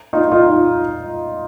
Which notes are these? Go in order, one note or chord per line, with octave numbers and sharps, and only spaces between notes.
D#4 F4
D#4 F4